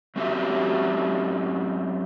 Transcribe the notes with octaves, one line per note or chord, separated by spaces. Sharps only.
F#3 C4 C#4 F#4 G4 E5